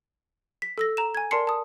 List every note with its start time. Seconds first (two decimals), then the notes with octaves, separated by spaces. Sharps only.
0.62 B6
0.78 A4 E6 A#6
0.97 A#5 E7
1.15 G#5 G#6
1.31 A#4 D5 A5 C6 C7 C#7
1.47 A5 D#6